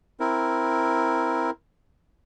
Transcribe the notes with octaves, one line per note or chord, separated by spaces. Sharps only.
C4 E4 A#4